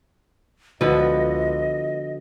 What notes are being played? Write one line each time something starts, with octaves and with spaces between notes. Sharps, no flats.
C#2 D3 F3 B3 F#4 D#5